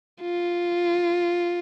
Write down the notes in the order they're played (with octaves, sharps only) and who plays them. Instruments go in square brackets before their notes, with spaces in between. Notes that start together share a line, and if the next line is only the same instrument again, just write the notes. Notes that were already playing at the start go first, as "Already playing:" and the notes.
[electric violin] F4